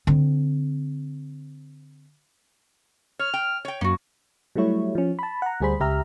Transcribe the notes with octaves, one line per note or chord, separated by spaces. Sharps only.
D3 C4
C#5 F6
G5
C#5 G5
F#2 A#3 F#4
F#3 G3 A3 E4 C#5
F3 C#4
A5 B5
F#5 A#5
D2 G3 G#4 C5 B5
C#2 G4 E5 A#5 F6